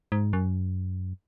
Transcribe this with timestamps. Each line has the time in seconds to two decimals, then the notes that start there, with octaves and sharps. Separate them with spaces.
0.12 G#2
0.33 F#2